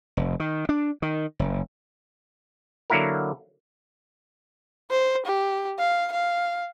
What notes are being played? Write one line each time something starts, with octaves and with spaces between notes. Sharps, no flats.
F1
D#3
D4
D#3
F#1
D3 F#3 A#3 E4 F#4 A#4
C5
G4
F5
F5